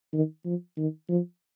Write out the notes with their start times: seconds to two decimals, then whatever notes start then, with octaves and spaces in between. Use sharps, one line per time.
0.13 D#3
0.45 F3
0.77 D#3
1.09 F3